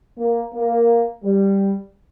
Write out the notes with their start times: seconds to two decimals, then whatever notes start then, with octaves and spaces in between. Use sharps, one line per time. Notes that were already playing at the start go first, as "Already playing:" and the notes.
0.19 A#3
0.54 A#3
1.24 G3